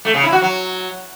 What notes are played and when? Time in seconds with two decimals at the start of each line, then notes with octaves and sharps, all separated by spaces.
0.05 A3
0.14 C#3
0.23 E4
0.32 F#4
0.42 F#3